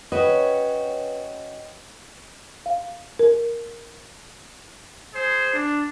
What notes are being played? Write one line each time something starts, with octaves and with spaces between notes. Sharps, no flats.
C#4 F#4 B4 C#5 D#5 G5
F5
A#4
G#4 C5
D4